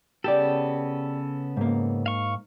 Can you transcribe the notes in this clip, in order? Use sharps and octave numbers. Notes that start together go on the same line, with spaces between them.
C#3 B3 G4 A4 D5
G#2 A#3
F5 C#6